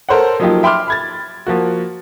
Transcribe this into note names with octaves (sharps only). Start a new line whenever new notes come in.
A4 A#4 C5 C#5 F#5
F3 F#3 A#3 D#4 F4 G4
E5 G5 B5 C6 D6 F6
B5 G#6 A6
F3 A#3 F#4